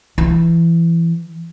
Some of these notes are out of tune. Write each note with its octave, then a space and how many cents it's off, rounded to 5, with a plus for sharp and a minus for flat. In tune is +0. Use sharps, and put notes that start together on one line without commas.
E3 +20